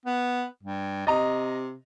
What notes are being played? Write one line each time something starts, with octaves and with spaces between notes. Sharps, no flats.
B3
G2
C3 D#5 A#5